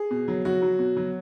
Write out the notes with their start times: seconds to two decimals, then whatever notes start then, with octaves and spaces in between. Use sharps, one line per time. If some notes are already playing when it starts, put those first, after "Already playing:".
Already playing: G#4
0.11 B2
0.28 F#3
0.45 F#3 F#4
0.62 F#3
0.79 B2
0.97 F#3